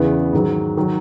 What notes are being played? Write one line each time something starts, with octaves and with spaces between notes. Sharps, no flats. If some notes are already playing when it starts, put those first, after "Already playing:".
Already playing: E2 C#3 E3 B3
G#2 D#3 F#3
D#3 F#3